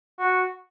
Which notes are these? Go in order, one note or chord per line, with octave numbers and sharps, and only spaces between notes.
F#4